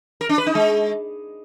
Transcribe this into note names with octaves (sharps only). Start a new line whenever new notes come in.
A#4
D4
B4
D#4
G#3